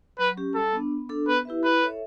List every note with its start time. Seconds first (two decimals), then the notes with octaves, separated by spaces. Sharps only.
0.19 F#3 B4
0.37 C#4 G4
0.55 G3 A4
0.73 B3 D4
0.92 B3
1.09 D4 A4
1.28 B3 B4
1.45 E4 G4 B4 E5
1.64 E4 B4
1.82 A4 C#5 E5